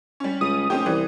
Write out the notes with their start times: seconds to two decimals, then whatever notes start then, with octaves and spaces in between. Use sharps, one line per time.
0.20 G3 C#4
0.41 C#2 D#6
0.70 F1 C4 C#4 G4
0.86 C2 E3